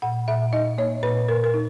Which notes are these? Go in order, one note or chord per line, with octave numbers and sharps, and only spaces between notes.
A#2 F#5
A#2 E5
D#4 D#5
A#3 C#5
A#2 B4
A#2 A#4
A#4
D#4